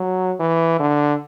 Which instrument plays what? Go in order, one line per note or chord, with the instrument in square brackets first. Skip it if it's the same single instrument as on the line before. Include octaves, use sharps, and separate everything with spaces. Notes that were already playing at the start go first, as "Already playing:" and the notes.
Already playing: [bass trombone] F#3
E3
D3